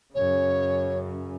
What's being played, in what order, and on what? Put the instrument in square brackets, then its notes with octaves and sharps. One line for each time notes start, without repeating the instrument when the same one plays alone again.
[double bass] F#2 C#3 [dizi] C#5